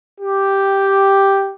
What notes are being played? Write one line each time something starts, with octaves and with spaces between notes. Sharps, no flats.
G4